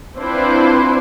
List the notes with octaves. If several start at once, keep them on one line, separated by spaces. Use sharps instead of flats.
C4 D4 E4 F4 B4 C5